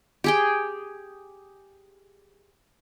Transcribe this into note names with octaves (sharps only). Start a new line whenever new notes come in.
G4 G#4 G5